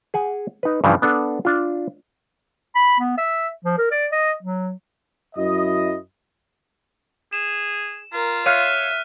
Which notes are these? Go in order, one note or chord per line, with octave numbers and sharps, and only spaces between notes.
G#4 F#5 G#5
D#4 B4
G2 C#3 E3 F3
B3 D4 A4 F#5
D4 F4
B5
B3
E5
F3
A#4
D5
D#5
F#3
F#2 E4 D#5
G#4 E7
F4 A#4
C#5 E5 F5 F6 F#6 D#7